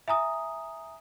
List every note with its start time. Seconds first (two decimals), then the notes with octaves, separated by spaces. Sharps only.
0.08 E5 G#5 A#5 D#6